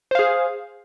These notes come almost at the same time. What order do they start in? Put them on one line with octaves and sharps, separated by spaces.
C5 F5 G#4